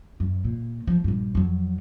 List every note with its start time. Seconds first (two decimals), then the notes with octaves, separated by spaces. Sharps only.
0.20 F#2
0.45 A#2
0.87 F3
1.04 A#1 G2
1.35 F2 F#3